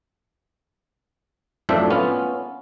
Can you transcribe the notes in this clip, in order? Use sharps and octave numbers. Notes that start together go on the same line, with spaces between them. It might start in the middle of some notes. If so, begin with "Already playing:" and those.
F#2 A2 F3 C4 D4 E5
B3 C#4 F4